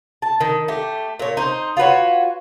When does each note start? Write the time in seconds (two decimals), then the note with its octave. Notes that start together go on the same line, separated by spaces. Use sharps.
0.22 A5
0.41 D#3
0.68 A3 G4
1.19 A#2 C#5
1.37 D#4 C5
1.77 F4 F#4 B4 C#5